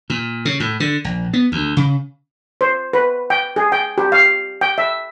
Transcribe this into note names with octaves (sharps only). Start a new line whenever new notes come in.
A#2
C#3
A2
D3
A#1
B3
D2
C#3
C5
B4
G5
G#4
G5
G4
F5
G5
E5